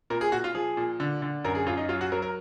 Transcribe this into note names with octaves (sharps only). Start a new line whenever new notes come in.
A#2 A#4
G#4
A#2 F#4
F4
F3 G#4
A#2
D3
D3
F#2 A#4
G#4
F#2 F4
D#4
F#3 F4
F#4
F#3 A#4
A#4